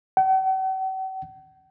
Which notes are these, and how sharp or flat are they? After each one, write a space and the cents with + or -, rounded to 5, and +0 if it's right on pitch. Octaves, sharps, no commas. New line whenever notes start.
F#5 +45